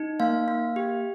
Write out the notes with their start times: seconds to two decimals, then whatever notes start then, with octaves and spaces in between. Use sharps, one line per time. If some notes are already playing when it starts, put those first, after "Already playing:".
Already playing: D#4
0.20 A#3 F5
0.48 A#3
0.76 G4